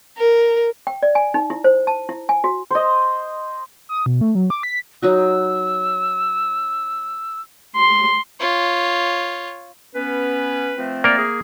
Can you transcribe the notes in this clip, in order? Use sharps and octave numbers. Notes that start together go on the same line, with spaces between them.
A#4
G5
D5
G#5
D#4
E4
C5
A5
E4
G#5
F#4
C5 D#5
D#6
B2
A3
F#3
D6
B6
F#3 D#4 F#4 E6
C6
F4 C#5
B3 C#4 B4
F3 A3 C4
A#3 A#4 D5
G#4